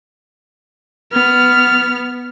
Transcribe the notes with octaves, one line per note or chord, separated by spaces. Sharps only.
B3 F6